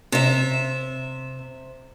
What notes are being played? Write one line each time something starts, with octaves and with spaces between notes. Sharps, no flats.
C3 E5